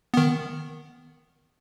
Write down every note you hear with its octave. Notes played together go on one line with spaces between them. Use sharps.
D#3 B3